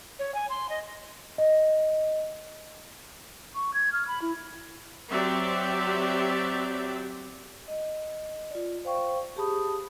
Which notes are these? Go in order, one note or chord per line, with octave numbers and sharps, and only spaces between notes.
C#5
G#5
C6
D#5
D#5
C#6
G#6
F6
B5
E4
F#3 C4 G4 D5 E5
D#5
F4 D5
C5 F5 G5 C#6
G4 G#4 A5 B5 D#6